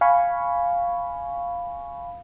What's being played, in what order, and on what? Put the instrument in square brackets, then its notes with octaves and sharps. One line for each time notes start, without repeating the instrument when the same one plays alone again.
[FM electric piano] F5 G#5 B5 C#6